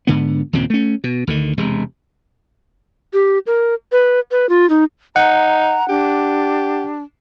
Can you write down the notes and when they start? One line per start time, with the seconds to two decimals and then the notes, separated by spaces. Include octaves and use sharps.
0.07 G#2 D3 B3
0.53 D#2 A#2 C#3 C4
0.70 A3 C#4
1.04 B2
1.27 D2 D3 D#3
1.58 E1 C3 G#3
3.13 G4
3.47 A#4
3.92 B4
4.31 B4
4.49 F4
4.70 D#4
5.16 D#4 F#5 A#5
5.89 D4 G4